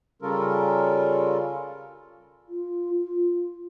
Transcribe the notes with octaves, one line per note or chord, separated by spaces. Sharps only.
C#3 G3 C#4 F4 A4 A#4
F4
F4